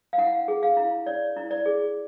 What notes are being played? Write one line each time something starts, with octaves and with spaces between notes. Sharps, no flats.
F5
E4 F#5
G#4
F5
E4
C#5 D5
E4
D5
G#4